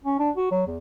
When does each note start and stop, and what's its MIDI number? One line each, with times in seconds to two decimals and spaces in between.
0.04 0.19 61
0.19 0.30 62
0.37 0.50 66
0.51 0.63 54
0.67 0.78 40